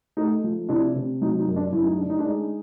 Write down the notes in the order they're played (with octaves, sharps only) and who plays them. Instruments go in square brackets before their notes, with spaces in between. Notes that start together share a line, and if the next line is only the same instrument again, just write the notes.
[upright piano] A3 D#4
F3
C3 D4 E4
C3
F#3 D#4
D#4
F#2
D4
F#2 E4
D#4
D3 D4
D#4
D4
G#3 D#4